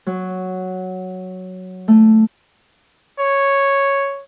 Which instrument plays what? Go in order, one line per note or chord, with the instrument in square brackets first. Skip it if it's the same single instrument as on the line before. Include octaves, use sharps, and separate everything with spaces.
[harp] F#3
A3
[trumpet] C#5